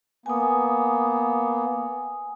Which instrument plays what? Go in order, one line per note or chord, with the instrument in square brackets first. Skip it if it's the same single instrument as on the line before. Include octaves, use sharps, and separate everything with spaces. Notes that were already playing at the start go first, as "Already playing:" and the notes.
[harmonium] A#3 B3 [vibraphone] G#5 D#6